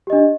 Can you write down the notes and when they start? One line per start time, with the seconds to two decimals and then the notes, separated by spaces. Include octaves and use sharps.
0.07 G4
0.10 D#5
0.13 D4